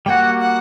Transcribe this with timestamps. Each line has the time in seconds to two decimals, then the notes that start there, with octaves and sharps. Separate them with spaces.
0.06 G3 A#3 F#4 F#5 G5
0.41 F#5